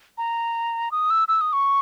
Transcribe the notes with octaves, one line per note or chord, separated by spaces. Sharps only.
A#5
D#6
E6
E6
D#6
C#6